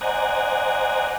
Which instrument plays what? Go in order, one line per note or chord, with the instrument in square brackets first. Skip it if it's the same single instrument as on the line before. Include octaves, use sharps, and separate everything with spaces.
[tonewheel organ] C5 D5 D#5 F#5 G#5 A#5